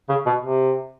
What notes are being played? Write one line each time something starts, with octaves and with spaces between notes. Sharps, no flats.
C#3
B2
C3